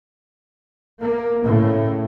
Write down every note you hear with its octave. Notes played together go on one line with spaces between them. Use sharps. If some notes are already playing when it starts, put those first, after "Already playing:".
A#3
A2 C#3